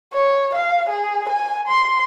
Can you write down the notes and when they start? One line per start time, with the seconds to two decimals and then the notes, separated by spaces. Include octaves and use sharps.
0.14 C#5
0.55 F5
0.89 G#4
1.29 G#5
1.68 C6